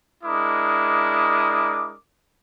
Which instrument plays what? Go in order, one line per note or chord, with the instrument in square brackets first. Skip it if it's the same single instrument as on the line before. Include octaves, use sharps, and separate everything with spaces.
[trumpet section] G#3 D4 E4 A#4 D6 D#6